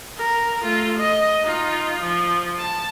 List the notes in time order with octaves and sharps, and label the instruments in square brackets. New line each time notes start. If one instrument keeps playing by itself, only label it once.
[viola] A#4
A3 F4
D#5
D#4 F4
F3
A5